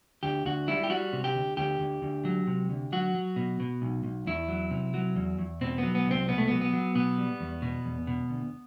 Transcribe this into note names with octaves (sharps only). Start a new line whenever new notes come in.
D2 G4
D2 F#4
G3 E4
G4
G3 F#4
C3
G4
D2
D2 G4
D2
D2
F#3
C3
D2
F#3 F#4
F#3
B2
B2
B1
B1
E2 E4
F#3
C3
F#3
E2
E2
B2 C4
F#3 B3
B3
C2 C4
B2 B3
A3
F#3 B3
B3
F#3
B2 B3
G3
E2
B2
E2
B2
D2